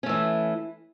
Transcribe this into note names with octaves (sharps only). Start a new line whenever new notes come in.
E3 A3 C#4